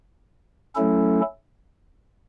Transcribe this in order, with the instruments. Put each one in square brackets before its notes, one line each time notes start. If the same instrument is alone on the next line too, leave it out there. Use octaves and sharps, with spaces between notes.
[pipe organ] F#3 A3 C#4 E4 A4